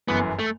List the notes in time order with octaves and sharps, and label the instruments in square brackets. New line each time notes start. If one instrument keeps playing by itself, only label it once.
[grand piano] G1 F#2 E3 [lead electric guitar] B3
[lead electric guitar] A3